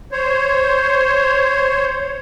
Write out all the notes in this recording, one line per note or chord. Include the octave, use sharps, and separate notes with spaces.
C5 C#5